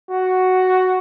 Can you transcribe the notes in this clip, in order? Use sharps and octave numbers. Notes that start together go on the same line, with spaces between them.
F#4